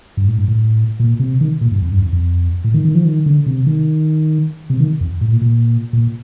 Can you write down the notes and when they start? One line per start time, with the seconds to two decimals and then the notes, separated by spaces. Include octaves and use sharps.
0.17 G2
0.27 A2
0.38 G2
0.48 A2
1.00 A#2
1.20 C3
1.41 D#3
1.61 A#2
1.72 G2
1.82 F2
1.92 G2
2.02 F2
2.13 F2
2.64 A2
2.74 D#3
2.85 D#3
2.95 F3
3.05 D#3
3.26 D3
3.46 C3
3.67 D#3
4.70 C3
4.80 D#3
5.01 F2
5.21 A2
5.31 A#2
5.41 A#2
5.93 A#2